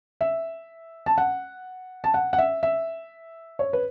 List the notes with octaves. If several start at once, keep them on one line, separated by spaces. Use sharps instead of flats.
E5
A5
F#5
A5
F#5
F#5
E5
E5
C#5
B4